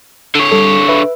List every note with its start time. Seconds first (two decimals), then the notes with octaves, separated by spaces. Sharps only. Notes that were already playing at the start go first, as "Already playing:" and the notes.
0.35 D3 C#5
0.52 G3 A4
0.88 B4 E5